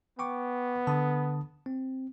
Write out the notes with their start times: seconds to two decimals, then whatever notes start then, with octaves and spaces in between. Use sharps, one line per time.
0.19 B3 G5 C#6 D6
0.87 D3 A5 D#6
1.66 C4